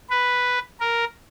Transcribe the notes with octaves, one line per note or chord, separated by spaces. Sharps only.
B4
A#4